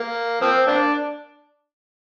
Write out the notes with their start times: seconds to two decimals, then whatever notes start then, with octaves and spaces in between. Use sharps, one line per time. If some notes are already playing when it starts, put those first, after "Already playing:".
Already playing: A#3
0.41 F3 C4
0.67 A#3 D4